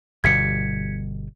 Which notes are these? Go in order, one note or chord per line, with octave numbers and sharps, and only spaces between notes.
G1 B2 G3 G#6 B6 C#7